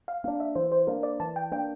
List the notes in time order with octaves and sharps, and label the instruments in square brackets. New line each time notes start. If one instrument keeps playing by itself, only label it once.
[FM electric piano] F5
[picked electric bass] A#3 [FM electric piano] F5
[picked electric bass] D4
[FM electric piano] E5
[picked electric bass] E3 [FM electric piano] C5
[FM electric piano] C5
[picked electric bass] A#3 D4 [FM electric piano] A#4
[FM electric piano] D5
[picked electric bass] E3 [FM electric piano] A5
[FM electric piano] G5
[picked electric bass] A#3 D4 [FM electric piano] G5